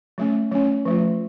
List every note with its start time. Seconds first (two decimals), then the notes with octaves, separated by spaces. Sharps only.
0.18 F#3 A3 C#4
0.51 F#3 A3 C#4
0.85 F3 A3 F4